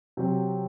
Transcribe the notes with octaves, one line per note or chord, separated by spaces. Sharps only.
C3 F#3 C4